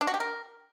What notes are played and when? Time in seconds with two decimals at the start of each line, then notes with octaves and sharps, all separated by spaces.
0.01 D4
0.07 F#4
0.14 G4
0.20 A#4